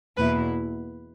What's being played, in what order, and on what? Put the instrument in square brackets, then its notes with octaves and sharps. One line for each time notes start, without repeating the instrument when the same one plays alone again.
[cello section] E2 B2 A#3 E4 [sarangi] B4